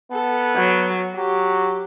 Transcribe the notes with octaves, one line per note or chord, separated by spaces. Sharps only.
B3 A4
F#3
F#3 G4